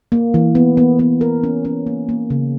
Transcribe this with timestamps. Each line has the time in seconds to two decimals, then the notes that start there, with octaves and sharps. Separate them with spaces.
0.12 A#3
0.34 E3
0.55 B3
0.77 B3
0.99 B3
1.21 A#4
1.43 C#4
1.65 C#4
1.87 A#3
2.09 A#3
2.30 C#3